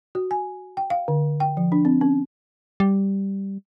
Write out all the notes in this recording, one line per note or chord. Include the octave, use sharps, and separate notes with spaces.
F#4
G#5
G5
F5
D3
G5
F3
D4
C4
C#4
G3